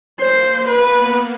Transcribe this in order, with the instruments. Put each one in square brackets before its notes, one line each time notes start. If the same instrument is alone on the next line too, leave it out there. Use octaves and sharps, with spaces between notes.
[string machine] A#3 [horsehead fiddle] C5
[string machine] B3 [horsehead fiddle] B4